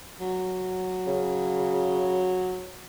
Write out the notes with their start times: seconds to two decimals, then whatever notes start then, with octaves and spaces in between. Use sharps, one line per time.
0.21 F#3
1.07 C#3